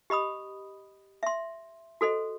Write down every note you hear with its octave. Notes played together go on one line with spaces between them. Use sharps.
G4 D#5 B5 D#6
E5 C6
F#4 A4 C5 D#5